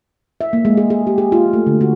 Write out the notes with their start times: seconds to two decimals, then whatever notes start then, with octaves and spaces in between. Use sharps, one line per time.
0.41 E5
0.53 A#3
0.65 G#3
0.77 G#4
0.90 G#4
1.07 G4
1.18 G#4
1.32 F4
1.53 A3
1.67 D3
1.81 F#4